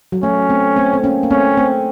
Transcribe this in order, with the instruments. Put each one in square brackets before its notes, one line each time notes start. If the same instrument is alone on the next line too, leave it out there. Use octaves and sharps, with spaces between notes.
[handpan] F#3
[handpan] A3 [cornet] C#4
[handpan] A3 C4
A3 C4
C4
A#3 C#4
A#3
[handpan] A3 C4 [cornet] C#4
[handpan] A3 C4